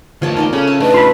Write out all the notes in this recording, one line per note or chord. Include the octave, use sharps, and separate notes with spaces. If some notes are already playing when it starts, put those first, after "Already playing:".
D2 F3 A#3 C#5 A5
D#4 A#4 D5 D#5
C#3 C#4 A4
E5 A5
A3 D4 D#4 B4
F4 B5